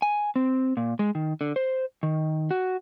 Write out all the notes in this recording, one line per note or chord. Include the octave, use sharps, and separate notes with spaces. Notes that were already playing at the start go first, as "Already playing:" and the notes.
G#5
C4
A#2
G#3
D#3
D3
C5
D#3
F#4